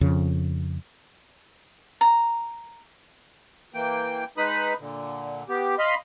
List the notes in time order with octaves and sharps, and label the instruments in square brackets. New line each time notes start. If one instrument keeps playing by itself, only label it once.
[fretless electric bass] F2 C#3
[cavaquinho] A#5
[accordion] E3 A#3 G5
G#3 D#4 B4 B5 D#6 F#6
A#2 D3
B3 G4
D#5 F5 B5 C6